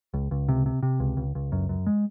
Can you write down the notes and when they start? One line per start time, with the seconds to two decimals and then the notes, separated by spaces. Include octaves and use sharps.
0.14 C#2
0.31 C#2
0.49 C3
0.66 C3
0.83 C3
1.00 C#2
1.17 C#2
1.35 C#2
1.52 F#2
1.69 F#2
1.86 G#3